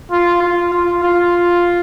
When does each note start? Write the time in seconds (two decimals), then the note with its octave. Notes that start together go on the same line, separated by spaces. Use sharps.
0.11 F4
0.43 F4
0.73 F4
1.04 F4